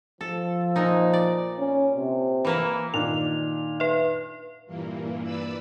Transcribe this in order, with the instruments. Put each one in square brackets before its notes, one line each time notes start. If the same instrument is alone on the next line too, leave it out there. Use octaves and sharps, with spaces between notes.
[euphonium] F3 [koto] A4
[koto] A#2 D#4
D5
[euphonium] C#4
C3
[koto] E3 A#3 E4
[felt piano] A#2 D#3 D4 [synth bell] F7
[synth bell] B4 E5
[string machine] G2 A#2 E3 A#3
B4 D5 B5 E6